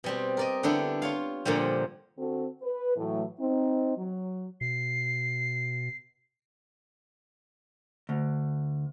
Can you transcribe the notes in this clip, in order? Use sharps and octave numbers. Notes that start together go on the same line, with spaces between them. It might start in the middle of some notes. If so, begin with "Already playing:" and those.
B2 G3 C4
A#4 D5 D#5
D3 B3 D4 E4 G4
F4 C#5 F5
A#2 D3 F3 G3
D3 C4 F#4 A4
B4
A2 E3 F#3 A3
C4 D#4
F#3
B2 C7
D2